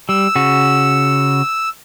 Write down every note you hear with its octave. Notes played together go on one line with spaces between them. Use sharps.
G3 E6
C#3 F#4